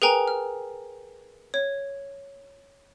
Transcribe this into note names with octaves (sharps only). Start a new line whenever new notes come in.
G#4 A#4 B4 G5 G#5 A#5
F6
C#5